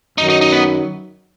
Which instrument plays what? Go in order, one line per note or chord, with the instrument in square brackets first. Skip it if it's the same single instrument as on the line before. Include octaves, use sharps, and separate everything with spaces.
[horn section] F#2 D#3 F#3 [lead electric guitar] D#4
[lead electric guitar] D#4
D#4
B3